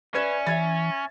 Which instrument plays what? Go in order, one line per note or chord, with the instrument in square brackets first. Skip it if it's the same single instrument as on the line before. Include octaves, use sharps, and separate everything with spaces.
[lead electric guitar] C#4 [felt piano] B4 G#6 E7 [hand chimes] D5 E5
[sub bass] E3 [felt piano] E5 G#6 A6 [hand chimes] B5